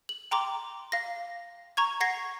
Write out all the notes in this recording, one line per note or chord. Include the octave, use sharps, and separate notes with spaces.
F#7
G5 A#5 C6 D6
F5 A#6
A#5 C#6 G#6
F#5 G#6 A#6 C7